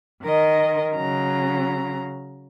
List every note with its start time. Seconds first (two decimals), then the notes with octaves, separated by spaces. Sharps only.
0.23 D#3 A#4 D#5
0.95 C#3 F#3 A#5